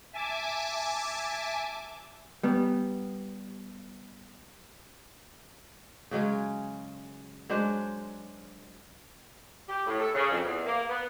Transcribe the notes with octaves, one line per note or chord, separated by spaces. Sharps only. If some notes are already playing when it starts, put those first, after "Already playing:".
E5 G#5 A5 D6
G3 B3
C#3 F#3 G#3 C#4
F#3 G#3 D4 C5
G4
A2
A4
C#3
F2
E2
A#3
B3